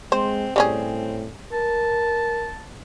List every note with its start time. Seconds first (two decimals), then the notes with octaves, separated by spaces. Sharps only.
0.12 G#3 C4 C5
0.56 A2 G3 C4 C#4 G#4
1.52 A#4 A5